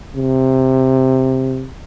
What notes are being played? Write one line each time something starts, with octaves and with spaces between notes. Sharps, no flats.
C3